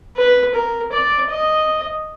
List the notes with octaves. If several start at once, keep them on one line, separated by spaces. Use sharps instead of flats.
B4
A#4
D5
D#5